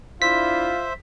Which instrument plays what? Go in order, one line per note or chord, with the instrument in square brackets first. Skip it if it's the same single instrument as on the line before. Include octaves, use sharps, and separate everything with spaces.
[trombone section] D4 E4 [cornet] F4 [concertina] C5 E5 [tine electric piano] B6